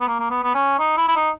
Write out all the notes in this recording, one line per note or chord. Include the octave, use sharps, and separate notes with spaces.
B3
A#3
A#3
B3
B3
C#4
D#4
E4
E4
D#4